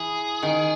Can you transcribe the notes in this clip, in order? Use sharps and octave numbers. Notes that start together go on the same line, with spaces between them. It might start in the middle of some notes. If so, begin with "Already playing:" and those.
Already playing: E3 G#4
D#3